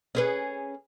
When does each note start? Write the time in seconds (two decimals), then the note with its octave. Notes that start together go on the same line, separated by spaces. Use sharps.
0.15 C#4 G#4 B4